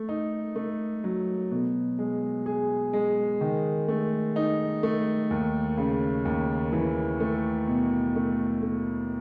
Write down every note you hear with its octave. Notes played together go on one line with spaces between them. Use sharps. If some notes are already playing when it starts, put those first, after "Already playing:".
Already playing: A3
D#4
A3
F#3
B2
G#3
G#4
G#3
D#3
A3
D#4
A3
D#2
C#3
D#2
E3
A3
B2
A3
A3